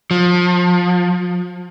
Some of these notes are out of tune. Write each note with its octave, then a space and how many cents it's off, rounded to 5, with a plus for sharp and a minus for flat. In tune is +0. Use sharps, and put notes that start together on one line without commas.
F3 +30